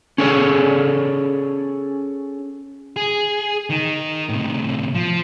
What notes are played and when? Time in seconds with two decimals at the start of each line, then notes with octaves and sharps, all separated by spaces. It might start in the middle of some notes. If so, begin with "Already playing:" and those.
0.18 C#4 G#4 A4 C#5 D5
2.96 G#4
3.70 D#3 D#4
4.29 A2 C3
4.95 F3